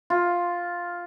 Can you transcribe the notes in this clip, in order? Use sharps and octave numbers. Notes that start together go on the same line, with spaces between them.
F4